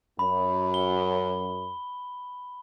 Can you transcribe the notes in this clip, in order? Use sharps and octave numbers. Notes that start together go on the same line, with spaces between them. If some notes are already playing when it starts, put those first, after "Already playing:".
F#2 B5
G7